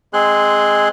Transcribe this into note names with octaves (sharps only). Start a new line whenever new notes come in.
G#3 C4 G#4 C6 F#6